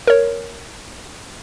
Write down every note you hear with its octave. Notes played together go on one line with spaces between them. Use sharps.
A#4 C#5